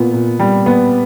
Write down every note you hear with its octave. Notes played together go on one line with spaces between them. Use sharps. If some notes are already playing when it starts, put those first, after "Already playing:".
Already playing: A#2 B3
A#2
G3
B3